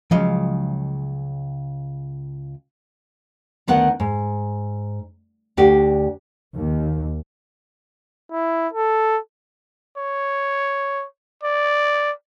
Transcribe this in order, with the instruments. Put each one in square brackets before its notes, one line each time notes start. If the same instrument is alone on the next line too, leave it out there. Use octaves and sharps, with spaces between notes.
[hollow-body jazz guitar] C#2 C#3 D#5 [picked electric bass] F3 F#3 G#3
[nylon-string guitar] D2 D#3 B3 F#5
G#2
D2 D4 F#4 G4
[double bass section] D#2
[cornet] E4
A4
[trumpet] C#5
D5